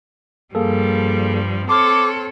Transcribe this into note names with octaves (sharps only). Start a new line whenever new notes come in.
G2 F3 G3 A#3 G#4 A4
C4 A4 C#5 A5 C6 D6 F6